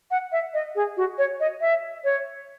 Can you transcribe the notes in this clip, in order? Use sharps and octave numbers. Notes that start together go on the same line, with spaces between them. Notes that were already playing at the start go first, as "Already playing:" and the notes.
F#5
E5
D#5
G#4
F#4
C#5
D#5
E5
C#5